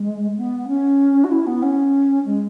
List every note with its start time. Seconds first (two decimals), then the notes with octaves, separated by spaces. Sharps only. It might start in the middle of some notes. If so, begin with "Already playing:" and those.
Already playing: G#3
0.37 B3
0.68 C#4
1.24 F#4
1.31 E4
1.47 B3
1.63 C#4
2.25 G#3